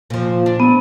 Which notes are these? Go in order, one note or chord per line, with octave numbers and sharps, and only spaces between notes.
A#2 F3
D4
B3